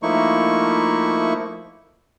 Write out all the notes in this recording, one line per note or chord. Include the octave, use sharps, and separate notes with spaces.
F3 A3 A#3 D#4 E4 C#6